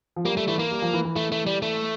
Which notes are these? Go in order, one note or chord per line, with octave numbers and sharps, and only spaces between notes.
F3
G3 A#3
G3 A3
E3 A3
A#3
G3
F3
E3
E3
A3
A3
G3
A3